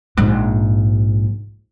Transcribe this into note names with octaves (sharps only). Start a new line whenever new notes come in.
A#1 G#2